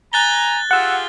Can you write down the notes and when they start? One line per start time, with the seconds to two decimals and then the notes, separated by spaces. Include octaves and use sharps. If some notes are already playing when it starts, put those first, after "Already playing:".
0.13 G#5 A#5 F#6 A6 G7
0.71 F4 G4 G#4 F#5 E6